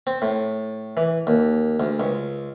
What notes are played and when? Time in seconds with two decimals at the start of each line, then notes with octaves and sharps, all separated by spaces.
0.07 C4
0.22 A2
0.97 E3
1.27 D#2
1.80 D2
2.00 C#2